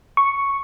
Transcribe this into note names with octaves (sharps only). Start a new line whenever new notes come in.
C#6